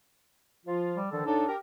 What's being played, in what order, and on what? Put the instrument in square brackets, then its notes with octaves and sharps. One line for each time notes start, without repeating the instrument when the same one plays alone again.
[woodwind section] F3 F4
[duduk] G3
[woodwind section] D3 D#3 F3 [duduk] A4
[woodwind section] A2 D#4 A4 [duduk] D4
[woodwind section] G4 A#4